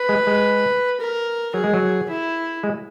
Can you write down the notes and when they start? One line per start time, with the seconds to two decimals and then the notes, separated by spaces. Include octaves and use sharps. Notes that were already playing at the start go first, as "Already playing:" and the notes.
Already playing: B4
0.09 G#3
0.27 G#3
1.00 A#4
1.54 F#3 G#4
1.64 G#3
1.74 F#3
2.09 E4
2.63 G#3